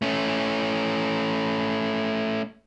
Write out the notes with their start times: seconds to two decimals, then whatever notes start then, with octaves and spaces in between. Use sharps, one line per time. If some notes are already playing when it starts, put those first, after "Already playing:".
0.02 A3 C#4